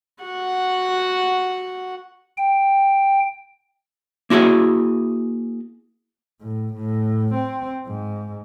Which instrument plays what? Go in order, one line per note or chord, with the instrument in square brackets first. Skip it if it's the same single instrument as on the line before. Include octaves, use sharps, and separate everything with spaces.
[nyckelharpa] F#4 F#5
[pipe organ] G5
[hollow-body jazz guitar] A#3 E4 F#4 G#4 E5
[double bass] A2
A2
C4
G#2